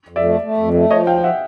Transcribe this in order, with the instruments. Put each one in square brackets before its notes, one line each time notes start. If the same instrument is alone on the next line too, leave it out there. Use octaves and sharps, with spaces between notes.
[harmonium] F2
[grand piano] D5 E5
[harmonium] A3
A3
F2
A3
[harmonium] F3 [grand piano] C#5 D#5
[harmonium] D2 [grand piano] F5 G5
[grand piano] E5 F#5